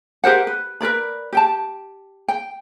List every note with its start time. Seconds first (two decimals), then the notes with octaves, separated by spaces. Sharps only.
0.24 G4 A#4 C5 F#5
0.47 B4
0.81 A#4 B4 D5 B5
1.33 G4 G5 A5
2.28 G5